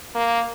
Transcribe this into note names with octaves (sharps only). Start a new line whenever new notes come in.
A#3